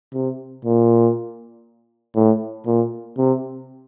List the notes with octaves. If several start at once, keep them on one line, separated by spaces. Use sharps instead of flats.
C3
A#2
A2
A#2
C3